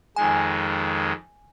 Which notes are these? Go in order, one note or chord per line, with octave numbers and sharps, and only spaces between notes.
F2 D#3 G#3 G#5